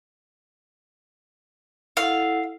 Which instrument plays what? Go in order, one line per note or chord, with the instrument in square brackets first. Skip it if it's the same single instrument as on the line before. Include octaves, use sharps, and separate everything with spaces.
[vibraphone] E4 A4 F#5 [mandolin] F5